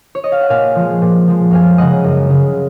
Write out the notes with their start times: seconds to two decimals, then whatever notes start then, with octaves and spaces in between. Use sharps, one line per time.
0.15 C#5
0.24 D#5
0.32 F5
0.41 F#5
0.49 A#2 F5 G#5
0.75 F3 G#3
1.02 A#2
1.28 F3 G#3
1.51 F#2 F5 G#5
1.78 C#3 G#3 D#5 F#5
2.04 F#2
2.30 C#3 G#3